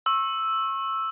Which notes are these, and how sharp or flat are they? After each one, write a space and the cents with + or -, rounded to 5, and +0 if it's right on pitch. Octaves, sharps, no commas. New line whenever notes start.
C#6 -35 E6 +0